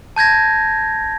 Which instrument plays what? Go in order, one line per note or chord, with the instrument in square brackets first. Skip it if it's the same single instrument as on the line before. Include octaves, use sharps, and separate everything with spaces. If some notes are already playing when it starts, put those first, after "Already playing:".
[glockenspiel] A5 G6 G#6 A#6